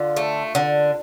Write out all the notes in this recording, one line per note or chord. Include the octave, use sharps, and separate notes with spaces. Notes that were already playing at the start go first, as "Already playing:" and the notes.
Already playing: D3 F4
A3
D3